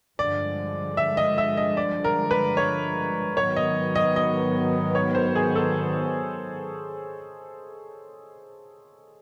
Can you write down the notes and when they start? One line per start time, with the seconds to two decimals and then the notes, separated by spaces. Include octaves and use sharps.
0.18 G2 D3 F3 G#3 D5
0.97 E5
1.17 D#5
1.38 E5
1.57 D#5
1.77 D5
2.04 A#4
2.31 B4
2.57 C#5
3.37 G#2 D#3 F#3 B3 C#5
3.56 D#5
3.96 D#5
4.16 D#5
4.95 C#5
5.15 C5
5.36 G#4
5.55 A4